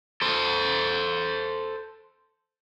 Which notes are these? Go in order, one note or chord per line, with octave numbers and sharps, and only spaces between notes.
A4 C5